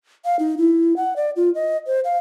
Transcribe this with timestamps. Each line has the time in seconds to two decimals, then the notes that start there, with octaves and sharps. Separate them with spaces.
0.25 F5
0.39 D#4
0.58 E4
0.96 F#5
1.16 D5
1.36 F4
1.55 D#5
1.87 C5
2.04 F5